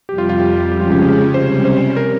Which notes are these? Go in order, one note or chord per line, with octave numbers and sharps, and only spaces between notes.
F2 C3 G3 G4
F4
F4
G4
C#3 F3 G#3 C#4 G4
F4
G4
G#4
C3 G3 C#4 C5
C5
A#4